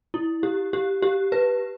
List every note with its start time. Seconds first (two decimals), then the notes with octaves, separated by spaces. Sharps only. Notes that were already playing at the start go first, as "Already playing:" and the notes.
0.14 E4
0.43 G4
0.73 G4
1.02 G4
1.32 B4